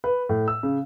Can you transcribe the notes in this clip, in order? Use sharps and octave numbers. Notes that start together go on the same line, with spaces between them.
B4
A2
E6
C#3